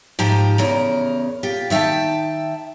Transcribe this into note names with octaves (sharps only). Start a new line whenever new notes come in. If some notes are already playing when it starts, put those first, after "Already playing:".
G#2 F3 G4 A#5
E2 C#3 A#4
F4 G4
D#3 E5 F5 G5 A5